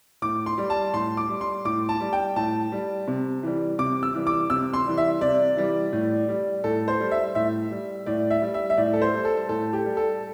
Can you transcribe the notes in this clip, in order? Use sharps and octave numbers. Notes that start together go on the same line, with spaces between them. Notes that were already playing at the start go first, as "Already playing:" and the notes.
A2 D6
C6
G3
A5
A2 C6
D6
G3
C6
A2 D6
A5
G3
G5
A2 A5
G3
C3
E3 G3
C3 D6
E6
E3 G3
D6
C3 E6
C6
E3 G3
E5
C3 D5
E3 G3
A2
G3
A2 A4
C5
G3
E5
A2 E5
G3
A2 D5
E5
G3
E5
E5
A2 D5
A4
C5
G3
A4
A2 A4
G4
G3
A4